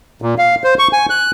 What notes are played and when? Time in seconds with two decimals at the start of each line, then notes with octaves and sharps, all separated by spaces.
0.22 A#2
0.38 F5
0.64 C5
0.79 C#6
0.93 G#5
1.10 F#6